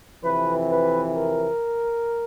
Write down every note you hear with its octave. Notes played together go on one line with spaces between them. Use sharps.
F2 C3 E3 B4
B4
A#4